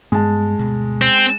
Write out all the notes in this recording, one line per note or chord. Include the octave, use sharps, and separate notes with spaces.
G2 G#3 B3 A5
D2 G2 B2
C4